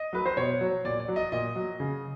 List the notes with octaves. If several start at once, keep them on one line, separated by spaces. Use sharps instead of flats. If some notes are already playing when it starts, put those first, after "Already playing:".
Already playing: D#5
F#3 B4
C5
B2 C#5
F#3
A#2 D5
D5
F#3
D#5
A#2 D#5
F#3
C#3